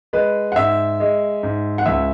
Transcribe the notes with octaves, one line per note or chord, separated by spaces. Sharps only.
G#3 B4
F#5
G#2 E5
G#3
G#2
F#5
C#2 E5